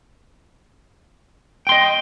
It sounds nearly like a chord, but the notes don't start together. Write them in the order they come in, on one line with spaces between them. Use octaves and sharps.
G5 C6 D#5